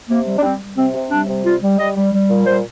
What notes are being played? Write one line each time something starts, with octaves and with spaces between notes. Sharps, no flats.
C3 A#3
G3
D4
G3 C4
G3
C3 C4
C3
G3 D4
C3
G3 F4
G3
G3 D#5
G3
G3
A#2
G3 C5